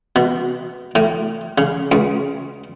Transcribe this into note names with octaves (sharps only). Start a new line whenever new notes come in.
B2
A2
C#3
C#2